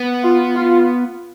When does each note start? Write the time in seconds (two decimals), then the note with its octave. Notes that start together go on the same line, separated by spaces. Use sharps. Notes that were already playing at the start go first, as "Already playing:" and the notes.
Already playing: B3
0.23 F4
0.55 F4